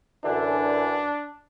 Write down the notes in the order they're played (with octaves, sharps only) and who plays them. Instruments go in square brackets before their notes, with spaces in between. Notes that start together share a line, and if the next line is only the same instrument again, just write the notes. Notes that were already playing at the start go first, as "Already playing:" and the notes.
[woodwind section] F#2 D3 E3 [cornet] D4